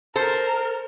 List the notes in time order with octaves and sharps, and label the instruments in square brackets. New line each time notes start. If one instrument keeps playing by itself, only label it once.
[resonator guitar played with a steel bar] A4 C5 [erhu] A#4